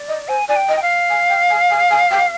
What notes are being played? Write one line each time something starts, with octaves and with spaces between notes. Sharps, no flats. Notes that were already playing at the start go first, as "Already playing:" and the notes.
Already playing: D5
D#5
C5 G#5
D5 G#5
G5
D#5
G5
F5
G#5
G5
G#5
G#5
G#5
G5